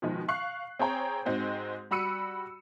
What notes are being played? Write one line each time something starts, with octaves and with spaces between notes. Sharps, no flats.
B2 D#3 F3 G#3
F5 C#6 F#6 C7
C4 G#4 C#5 G5 A#5
G#2 G#3 C4 F#4 C5
G3 F#4 B5 E6 C#7 D#7